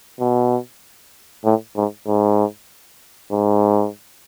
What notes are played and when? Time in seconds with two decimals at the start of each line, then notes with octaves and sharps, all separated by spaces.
0.20 B2
1.45 A2
1.76 G#2
2.07 G#2
3.32 G#2